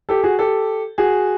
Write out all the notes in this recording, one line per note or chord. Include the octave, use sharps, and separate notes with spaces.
G4 A4
F#4 G#4
G4 A4
F#4 G#4